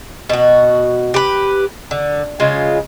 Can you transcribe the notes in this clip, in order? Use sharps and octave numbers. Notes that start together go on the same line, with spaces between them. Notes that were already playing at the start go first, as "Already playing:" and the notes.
B2 F#4
G4 B4
D3
C#3 G#3 F4